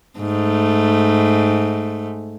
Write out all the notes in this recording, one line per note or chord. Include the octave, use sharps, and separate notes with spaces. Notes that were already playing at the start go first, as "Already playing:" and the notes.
G#2 A3